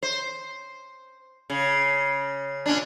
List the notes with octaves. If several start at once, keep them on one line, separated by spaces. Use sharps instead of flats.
C5
C#3
A#2 C#4 D4